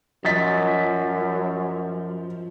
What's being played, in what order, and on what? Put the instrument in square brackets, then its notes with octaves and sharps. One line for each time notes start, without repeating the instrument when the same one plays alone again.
[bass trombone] F#2 [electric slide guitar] F3 [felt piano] D#5 A6 B6